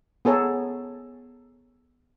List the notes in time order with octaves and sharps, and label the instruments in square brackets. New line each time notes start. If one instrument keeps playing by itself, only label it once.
[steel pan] B3 G#4 A4 C#5 A#5